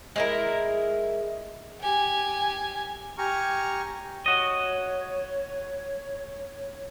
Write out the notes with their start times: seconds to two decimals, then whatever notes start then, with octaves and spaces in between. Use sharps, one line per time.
0.16 G#3 E4 A#4
1.81 G4 G#5
3.18 G4 G#5 A#5 C#6 F6
4.26 F#4 C#5 D#5